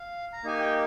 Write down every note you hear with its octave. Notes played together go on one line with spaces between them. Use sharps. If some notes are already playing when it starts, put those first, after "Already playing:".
Already playing: F5
A#5
A#3 D#4 G4 G#5
G5